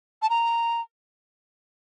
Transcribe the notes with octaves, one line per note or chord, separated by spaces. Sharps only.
A5
A#5